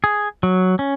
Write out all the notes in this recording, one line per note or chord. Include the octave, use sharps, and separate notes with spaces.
G#4
F#3
C#4